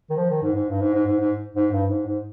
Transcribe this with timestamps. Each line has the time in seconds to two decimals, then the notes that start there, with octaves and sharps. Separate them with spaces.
0.10 D#3
0.17 F3
0.30 D#3
0.43 G#2
0.55 G#2
0.69 G2
0.81 G#2
0.94 G#2
1.07 G#2
1.20 G#2
1.55 G#2
1.72 G2
1.89 G#2
2.06 G#2